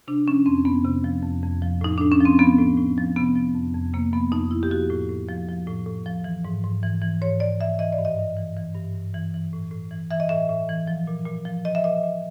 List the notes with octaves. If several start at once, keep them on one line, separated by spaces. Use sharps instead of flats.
C3 D4
F3 C#4
F2 C4
F2 B3
C3
F3
F2
F2
F3
A2 D#4
A2 D4
C#4
F3
C4
F3 B3
A2
A2
F3
C3 B3
F3
F2
F2
C3 A#3
F3 B3
F2 D#4
F2 E4
G4
F3 F#4
A2
A2
F3
F3
A2
A2
F3
E3
G#2
G#2
E3
E3
G#2 C#5
G#2 D5
E3 E5
E3 D#5
D5
G2
D#5
G2
E3
E3
G2
G2
E3
E3
A2
A2
E3
E3 E5
D#5
A2 E5
A2
E3
F3
A#2
A#2
F3
F3 D#5
E5
A#2 D#5
A#2